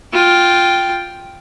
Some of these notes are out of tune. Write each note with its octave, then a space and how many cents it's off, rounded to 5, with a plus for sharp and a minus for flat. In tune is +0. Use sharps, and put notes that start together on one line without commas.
F4 +5 G5 +0